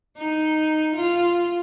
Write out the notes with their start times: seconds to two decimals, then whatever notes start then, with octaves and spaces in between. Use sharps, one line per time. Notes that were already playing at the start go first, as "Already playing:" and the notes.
0.18 D#4
0.96 F4